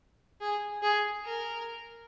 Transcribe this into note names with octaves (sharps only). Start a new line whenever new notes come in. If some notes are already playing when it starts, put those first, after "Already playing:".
G#4
G#4
A#4